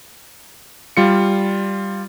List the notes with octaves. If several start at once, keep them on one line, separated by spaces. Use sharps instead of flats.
G3 F4 C#7